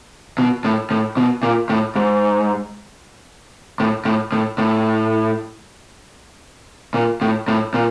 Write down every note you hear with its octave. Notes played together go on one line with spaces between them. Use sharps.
B2
A2
A2
B2
A#2
A2
G#2
A2
A2
A2
A2
A#2
A2
A2
A#2